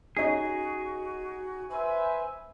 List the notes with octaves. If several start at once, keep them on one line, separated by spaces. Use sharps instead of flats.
C#4 D#4 F#4 G#4 D#5
B4 C5 E5 G#5